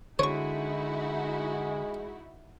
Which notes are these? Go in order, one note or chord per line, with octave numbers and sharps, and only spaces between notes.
D3 G#3 D#4 E4 F#4 C#5 C#6